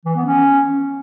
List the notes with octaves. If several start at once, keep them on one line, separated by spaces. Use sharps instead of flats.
E3
B3
C#4